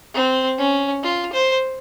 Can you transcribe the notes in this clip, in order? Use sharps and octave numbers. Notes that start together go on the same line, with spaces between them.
C4
C#4
F4
C5